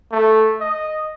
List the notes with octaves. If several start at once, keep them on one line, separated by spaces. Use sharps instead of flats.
A3
D#5